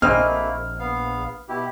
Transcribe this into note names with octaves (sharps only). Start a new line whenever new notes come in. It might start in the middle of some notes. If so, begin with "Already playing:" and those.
A#1 A3 A#3 C4 E4 D#5 G#5 F6
B3 F5
B2 E4 G4